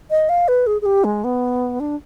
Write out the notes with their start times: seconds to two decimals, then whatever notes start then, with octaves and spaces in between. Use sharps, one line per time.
0.10 D#5
0.29 F5
0.48 B4
0.67 G#4
0.82 G#4
0.86 G4
1.04 G#3
1.24 B3
1.80 D4